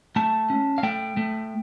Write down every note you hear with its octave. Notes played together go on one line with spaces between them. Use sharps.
A3 A5
C#4
F5
A3 G5
A3